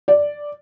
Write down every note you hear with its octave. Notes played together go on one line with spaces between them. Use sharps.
D5